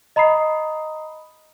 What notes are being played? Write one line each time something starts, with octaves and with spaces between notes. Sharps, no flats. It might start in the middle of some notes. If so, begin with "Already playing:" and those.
D#5 A#5 B5 D#6 C7